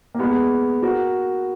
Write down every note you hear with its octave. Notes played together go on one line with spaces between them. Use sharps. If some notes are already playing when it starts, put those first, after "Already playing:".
A#3
G#3 B3
F#4 A#4